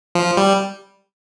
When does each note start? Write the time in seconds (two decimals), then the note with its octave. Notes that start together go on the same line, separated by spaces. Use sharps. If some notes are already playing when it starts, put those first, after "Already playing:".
0.15 F3
0.37 G3